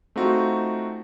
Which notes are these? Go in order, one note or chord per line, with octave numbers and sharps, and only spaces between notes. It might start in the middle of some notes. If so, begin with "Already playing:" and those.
A3 C4 D#4 F4 F#4